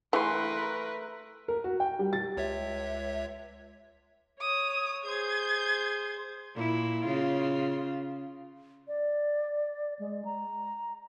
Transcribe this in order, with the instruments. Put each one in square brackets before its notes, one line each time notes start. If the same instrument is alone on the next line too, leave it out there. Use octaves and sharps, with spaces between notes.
[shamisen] E3 G#4 [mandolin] A3 C6 [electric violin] A#4 B4
[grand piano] A#4
F#4
G5
G3
A6
[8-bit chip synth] C#2 C#5 E5
[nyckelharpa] C#5 [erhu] D#6
[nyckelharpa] G#4 C5 [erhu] G#6
[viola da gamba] A#2 E4
C#3 F4
[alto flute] D5
G#3
A#5